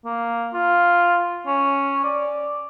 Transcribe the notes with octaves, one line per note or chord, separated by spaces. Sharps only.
A#3
F4
C#4
D5